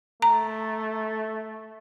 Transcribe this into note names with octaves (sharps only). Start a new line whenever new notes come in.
A3 A#5